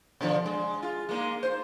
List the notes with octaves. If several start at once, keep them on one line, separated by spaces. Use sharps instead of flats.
B2 D3 F3
G#3
F4
G#3 A#3 D#4
C5